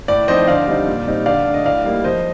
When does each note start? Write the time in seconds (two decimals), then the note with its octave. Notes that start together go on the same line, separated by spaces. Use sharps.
0.08 A2 D5
0.28 F3 C4 D#4 C5 D#5
0.47 D3 D5 F5
0.67 G3 C4 D#4
0.87 A#2
1.06 G3 C4 D#4
1.26 D3 D5 F5
1.46 A3 D4
1.54 D#5
1.65 A2 D5 F5
1.84 G3 A#3 D#4
2.04 F3 C5 D#5